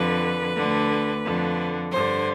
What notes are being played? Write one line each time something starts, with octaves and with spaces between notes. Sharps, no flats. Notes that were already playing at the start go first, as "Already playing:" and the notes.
Already playing: F2 D3 B4
D2 D3
F2 D3
G2 D3 C5